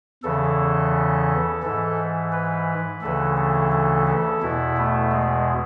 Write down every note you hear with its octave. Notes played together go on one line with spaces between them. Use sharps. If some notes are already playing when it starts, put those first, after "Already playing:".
E2 C#3 E3 A4
G#2 E3 A4
B4
D2 C#3 E3 A4
A4
A4
A4
E2 B2 E4
A3
G#3